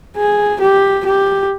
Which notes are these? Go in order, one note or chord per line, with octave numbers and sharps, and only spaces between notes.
G#4
G4
G4